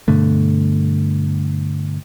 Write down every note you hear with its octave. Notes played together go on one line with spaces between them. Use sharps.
G2 B2 D3 A3